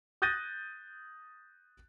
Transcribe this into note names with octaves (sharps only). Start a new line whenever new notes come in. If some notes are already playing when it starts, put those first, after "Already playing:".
D#6 F#6 G6 A6 A#6 D#7